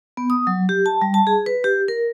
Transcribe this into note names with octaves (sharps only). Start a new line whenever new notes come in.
B3
D#6
F#3
G4
A5
G3
A5
G#4
B4
G4
A#4